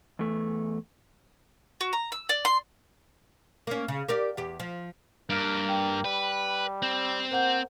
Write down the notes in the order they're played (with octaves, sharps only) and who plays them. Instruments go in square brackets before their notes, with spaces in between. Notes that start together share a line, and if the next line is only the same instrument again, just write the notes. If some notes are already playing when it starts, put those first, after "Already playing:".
[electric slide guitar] E2 A3
[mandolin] F#4
A#5
E6
D5
C6
[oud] A#3 C#4
C#3
G4 A#4 D5
E2 G4
F3
[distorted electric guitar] G2 [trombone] A#3 [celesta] F6 D7
[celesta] G5
[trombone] G3 [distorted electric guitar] B4
[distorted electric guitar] C4
[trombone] A#3 [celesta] C5 F#5 G6